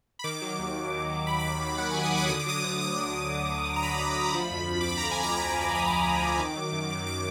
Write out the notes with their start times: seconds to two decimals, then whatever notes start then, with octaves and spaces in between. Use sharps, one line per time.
0.19 B5
0.24 D#3 D6
0.42 F#3
0.59 D#2
0.75 D#2
0.93 D#3
1.10 F#3
1.27 D#2 B5
1.40 D6
1.44 D#2
1.53 D6
1.61 D#3
1.66 D6
1.78 F#3 F#5
1.91 D#2 G#5
2.03 D#6
2.12 D#2
2.17 D6
2.29 D3 D#6
2.39 D6
2.46 F#3 D#6
2.64 D2
2.80 D2 D6
2.98 D3
3.15 F#3
3.32 D2
3.49 D2
3.65 D3
3.76 A#5
3.83 F#3 B5
4.00 D2
4.18 D2
4.34 F3
4.51 F2
4.68 F2
4.81 D6
4.85 F3 B5
4.97 A#5
5.03 F3
5.11 G#5
5.19 F2 A#5
5.36 F2 B5
5.49 F3 B5
5.62 D6
5.70 F3 D#6
5.87 F2 D6
6.04 F2
6.22 F3
6.39 D#3
6.56 F#3
6.72 F#2
6.90 F#2 D6
7.07 D#3 D6